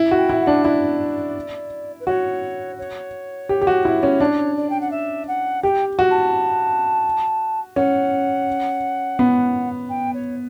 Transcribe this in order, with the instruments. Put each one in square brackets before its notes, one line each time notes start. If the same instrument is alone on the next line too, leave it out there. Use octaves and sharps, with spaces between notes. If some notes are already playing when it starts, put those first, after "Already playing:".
Already playing: [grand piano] E4
F#4
[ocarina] G5
[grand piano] E4
[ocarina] F#5
[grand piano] D4
[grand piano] E4 [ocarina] D5
[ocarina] B4
[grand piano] F#4 [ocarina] C#5
[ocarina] C#5
[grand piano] G4
G4
F#4
E4
C#4
[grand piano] D4 [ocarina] C#5
[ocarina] D5
G5
F#5
E5
F#5
[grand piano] G4 [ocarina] G5
[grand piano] F#4
[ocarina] A5
[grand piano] C#4 [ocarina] F#5
[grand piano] B3
[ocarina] G5
C#5